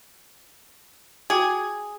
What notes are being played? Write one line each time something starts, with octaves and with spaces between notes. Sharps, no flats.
F#4 G#4 G5 D6